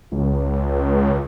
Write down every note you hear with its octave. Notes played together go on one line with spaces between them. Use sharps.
C#2